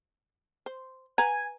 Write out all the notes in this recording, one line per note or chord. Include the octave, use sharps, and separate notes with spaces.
C5
B4 F#5 G#5 A#5